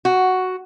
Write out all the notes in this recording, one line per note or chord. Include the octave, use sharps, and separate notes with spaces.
F#4